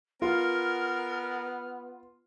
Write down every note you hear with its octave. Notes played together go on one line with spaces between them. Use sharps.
B3 F4 A#4 F6